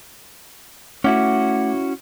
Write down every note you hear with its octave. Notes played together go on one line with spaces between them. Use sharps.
A3 C#4 E4 F#4 F#5 D6